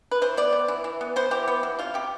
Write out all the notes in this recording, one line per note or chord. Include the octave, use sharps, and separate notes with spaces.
B4
E3 C5
B3 D5
B3
E3
E3
B3
B3 C5
E3 G4
B3
E3
C3 F4
C3 G4